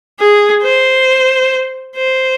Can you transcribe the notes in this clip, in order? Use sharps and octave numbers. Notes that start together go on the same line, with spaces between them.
G#4
C5
C5